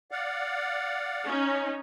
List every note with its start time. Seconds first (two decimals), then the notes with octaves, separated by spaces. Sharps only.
0.11 D5 F5 F#5
1.27 C#4 D#4